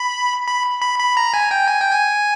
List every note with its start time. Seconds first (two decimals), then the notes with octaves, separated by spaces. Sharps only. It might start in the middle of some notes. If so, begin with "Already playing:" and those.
Already playing: B5
0.48 B5
0.81 B5
0.99 B5
1.17 A#5
1.34 G#5
1.51 G5
1.68 G#5
1.80 G5
1.92 G#5